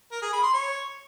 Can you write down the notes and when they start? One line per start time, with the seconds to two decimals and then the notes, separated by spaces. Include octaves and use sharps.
0.11 A#4
0.22 G#4
0.32 B5
0.43 C6
0.53 C#5